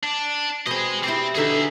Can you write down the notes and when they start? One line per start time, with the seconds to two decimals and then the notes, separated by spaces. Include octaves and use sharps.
0.04 D4
0.66 B2 C4 G#4 D#5
1.03 C4 E4 G4 D5
1.35 B2 D3 D#4 G#4 E5